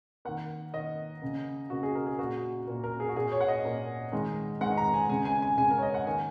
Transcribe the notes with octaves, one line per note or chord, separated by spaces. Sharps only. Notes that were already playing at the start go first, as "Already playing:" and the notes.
D#3 A#3 F#5
D#3 A#3 D#5
C#3 A#3
C#3 A#3 F#4
G#4
A#4
G#4
A#2 A#3 F#4
A#2 A#3
A#4
G#4
F#4
A#2 A#3 G#4
C#5
F#5
D#5
A#2 A#3
D#3 G#3
D#3 G#3 F#5
A#5
G#5
C#3 G#3 G#5
G#5
G#5
C#3 G#3 G#5
A#4
C#5
D#5
F#5
D#3 A#3 G#5